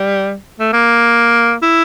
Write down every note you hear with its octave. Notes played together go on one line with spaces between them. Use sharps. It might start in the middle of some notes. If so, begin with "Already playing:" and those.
Already playing: G3
A3
A#3
E4